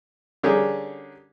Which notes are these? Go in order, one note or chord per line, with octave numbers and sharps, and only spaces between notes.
D3 G3 C#4 G4 G#4 A#4